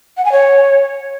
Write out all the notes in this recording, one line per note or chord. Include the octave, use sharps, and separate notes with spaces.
F#5
G#5
C#5